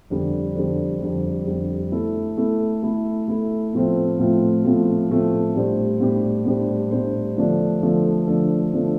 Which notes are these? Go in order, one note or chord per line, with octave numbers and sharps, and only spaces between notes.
F2 D3 G3
F2 D3 G3
F2 D3 G3
F2 D3 G3
A3 E4 A4
A3 E4 A4
A3 E4 A4
A3 E4 A4
A2 F3 A3 C4 F4
A2 F3 A3 C4 F4
A2 F3 A3 C4 F4
A2 F3 A3 C4 F4
A2 G3 D4 G4 C5
A2 G3 D4 G4 C5
A2 G3 D4 G4 C5
A2 G3 D4 G4 C5
D3 F3 A3 D4 A4
D3 F3 A3 D4 A4
D3 F3 A3 D4 A4
D3 F3 A3 D4 A4